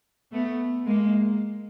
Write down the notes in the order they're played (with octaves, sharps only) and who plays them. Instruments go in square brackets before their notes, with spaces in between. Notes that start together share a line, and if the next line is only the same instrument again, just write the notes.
[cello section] A3 B3
G#3 A#3